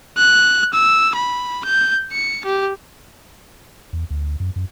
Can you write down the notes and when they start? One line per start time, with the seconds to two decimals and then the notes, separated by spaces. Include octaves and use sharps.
0.17 F#6
0.73 E6
1.15 B5
1.65 G6
2.12 C#7
2.45 G4
3.93 E2
4.10 D2
4.40 F#2
4.56 F#2